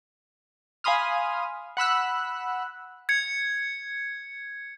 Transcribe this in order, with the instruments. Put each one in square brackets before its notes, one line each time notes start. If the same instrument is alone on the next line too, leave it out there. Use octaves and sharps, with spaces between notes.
[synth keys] F5 G#5 B5 C6 D#6 F6
F#5 B5 E6 F#6
[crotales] G#6 C#7